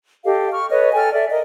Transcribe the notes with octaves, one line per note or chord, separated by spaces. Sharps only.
G4 A4 D#5 F5
C#6 F6
A4 B4 C#5 D#5
A4 G5 G#5 F6
A4 D5 E5
A#4 D#5